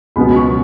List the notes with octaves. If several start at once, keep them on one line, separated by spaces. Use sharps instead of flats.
C#2 B2 F#3 B3 B5
C#6